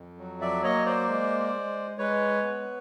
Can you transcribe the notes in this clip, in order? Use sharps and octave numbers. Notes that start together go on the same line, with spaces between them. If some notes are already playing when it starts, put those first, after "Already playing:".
Already playing: F2
F#3
D5 E5
A#3 C#5 D#5
C5 D5
G#3
G#3
G#3 B4 C#5
B3